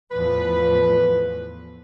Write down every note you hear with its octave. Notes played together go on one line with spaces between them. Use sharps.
E2 A2 F3 B4